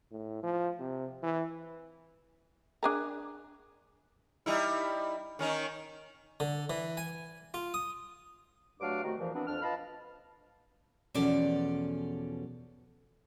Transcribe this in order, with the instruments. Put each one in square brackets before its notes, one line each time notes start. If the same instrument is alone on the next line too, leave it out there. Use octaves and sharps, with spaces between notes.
[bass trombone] A2
F3
C3
E3
[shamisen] D4 G#4 A#4
[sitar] G3 D#4 E4
D#3 C#4 D#4
[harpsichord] D3
E3
G#5
F4
D#6
[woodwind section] G2 F#3 A3 D4 F5 D6
C3 D#3 A3 F#4
E2 A#2 E3 F3
E3 B3 C4 D4
F2 D4 F6
F4 B4 D#5 F5 A5 B5
[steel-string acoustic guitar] E2 B2 F3 C#4 A4 D5